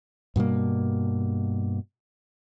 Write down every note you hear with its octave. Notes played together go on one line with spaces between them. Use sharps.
G2 B2 G3 A#3